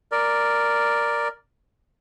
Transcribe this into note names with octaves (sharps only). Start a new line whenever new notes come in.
A#4 D5